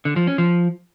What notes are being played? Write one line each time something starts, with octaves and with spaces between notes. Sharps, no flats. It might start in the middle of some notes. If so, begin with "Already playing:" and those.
D3
F3
C#4
F3